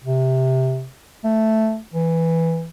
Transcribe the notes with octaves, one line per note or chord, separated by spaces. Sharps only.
C3
A3
E3